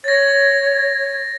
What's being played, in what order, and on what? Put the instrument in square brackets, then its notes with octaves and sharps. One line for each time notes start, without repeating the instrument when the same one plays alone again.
[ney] C#5 [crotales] A6 A#6